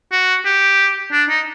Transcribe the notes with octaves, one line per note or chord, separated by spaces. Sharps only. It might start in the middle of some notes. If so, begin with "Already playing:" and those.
F#4
G4
D4
D#4